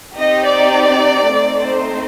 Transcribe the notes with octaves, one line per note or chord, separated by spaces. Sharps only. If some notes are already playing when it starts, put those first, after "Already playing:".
C4 D#4 G4 D#5
D5
A3 C4 D#4
C5